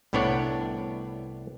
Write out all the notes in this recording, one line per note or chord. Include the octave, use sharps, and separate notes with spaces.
C2 A2 B3 D4 C#5 D5